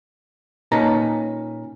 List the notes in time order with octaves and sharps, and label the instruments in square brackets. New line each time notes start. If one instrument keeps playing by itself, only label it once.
[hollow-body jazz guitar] A#2 C#4 D#4 B4 A5 A#5